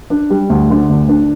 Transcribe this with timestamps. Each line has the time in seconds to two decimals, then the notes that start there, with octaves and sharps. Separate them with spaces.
0.10 D4
0.30 G3
0.50 D2
0.70 D3
0.89 D2
1.09 D4